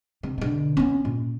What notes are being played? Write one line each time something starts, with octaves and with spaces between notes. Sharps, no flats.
C3
B2 D3
B3 C#4
A#2